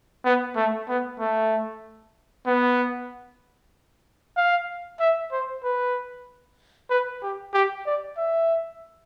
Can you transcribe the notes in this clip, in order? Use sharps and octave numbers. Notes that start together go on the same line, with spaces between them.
B3
A3
B3
A3
B3
F5
E5
C5
B4
B4
G4
G4
D5
E5